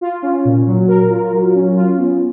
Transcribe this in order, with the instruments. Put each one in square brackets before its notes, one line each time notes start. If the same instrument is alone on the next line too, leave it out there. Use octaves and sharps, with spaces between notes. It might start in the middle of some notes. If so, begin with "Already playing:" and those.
[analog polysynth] F4
C#4
A#2
F#3
A#4
F4
F#3
C#4
F4
B3